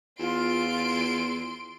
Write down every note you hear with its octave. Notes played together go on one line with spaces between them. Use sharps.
E2 F4 C6 D7